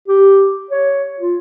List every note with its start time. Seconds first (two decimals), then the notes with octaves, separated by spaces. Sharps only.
0.08 G4
0.71 C#5
1.19 F4